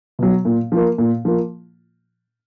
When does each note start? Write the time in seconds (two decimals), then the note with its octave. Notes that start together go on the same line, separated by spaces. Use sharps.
0.19 B2 F#3
0.45 A#2
0.72 F3 A#3
0.98 A#2
1.25 F3 A#3